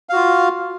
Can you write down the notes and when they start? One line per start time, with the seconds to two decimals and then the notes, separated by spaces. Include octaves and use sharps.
0.09 F5
0.13 F#4
0.16 F4